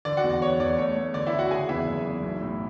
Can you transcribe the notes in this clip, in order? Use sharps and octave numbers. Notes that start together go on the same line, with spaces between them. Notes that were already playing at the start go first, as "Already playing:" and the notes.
D3 D5
F#4 F#5
E2
D5
E2 C#5
E2 D5
A3 C#5
A3
D3 D5
E4 E5
D3
F#4 F#5
C#3 G#4 G#5
E2 E4 E5
F#1
E2
B1
A2